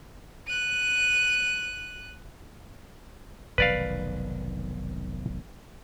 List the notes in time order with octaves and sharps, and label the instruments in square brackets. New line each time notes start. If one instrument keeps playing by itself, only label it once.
[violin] F#6 D#7
[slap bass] F1 B1 D#3 [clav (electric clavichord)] B4 D5 F5